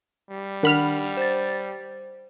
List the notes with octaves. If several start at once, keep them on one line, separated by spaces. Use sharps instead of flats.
G3
D#3 D4 F#5 B5 F6
C5 A6